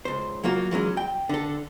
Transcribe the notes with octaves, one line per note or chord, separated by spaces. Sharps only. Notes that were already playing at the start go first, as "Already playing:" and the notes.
C#2 C5
F#3 A#3 F4 F#4
E3 F#3 G#3 C#4
G5
D3 A4